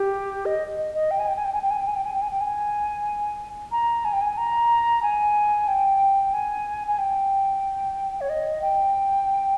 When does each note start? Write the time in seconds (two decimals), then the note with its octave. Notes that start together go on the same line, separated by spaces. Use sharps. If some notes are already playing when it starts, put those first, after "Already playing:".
Already playing: G4
0.46 D#5
0.78 D#5
0.94 D#5
1.11 G5
1.19 G#5
1.28 G5
1.36 G#5
1.45 G5
1.53 G#5
1.62 G5
1.70 G#5
1.79 G5
1.88 G#5
1.96 G5
2.04 G#5
2.13 G5
2.22 G#5
2.31 G5
2.41 G#5
3.72 A#5
4.05 G#5
4.13 G5
4.21 G#5
4.37 A#5
5.02 G#5
5.68 G5
6.33 G#5
6.87 G#5
6.98 G5
8.21 C#5
8.29 D#5
8.62 G5